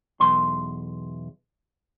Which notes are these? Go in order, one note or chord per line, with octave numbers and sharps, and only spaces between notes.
B1 E2 C6